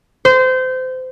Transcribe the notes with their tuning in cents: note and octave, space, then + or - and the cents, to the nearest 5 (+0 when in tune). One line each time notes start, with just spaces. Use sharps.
C5 -25